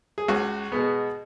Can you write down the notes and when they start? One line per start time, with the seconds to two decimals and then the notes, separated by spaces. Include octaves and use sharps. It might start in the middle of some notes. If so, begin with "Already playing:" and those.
0.18 G#4
0.28 C#2 F#4
0.72 B2 G#3 B3